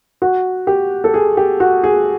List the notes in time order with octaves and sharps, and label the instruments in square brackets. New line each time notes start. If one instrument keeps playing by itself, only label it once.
[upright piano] F#4
G4
A4
G#4
G4
F#4
G#4